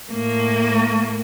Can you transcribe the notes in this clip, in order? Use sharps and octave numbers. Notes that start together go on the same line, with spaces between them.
A2 A#3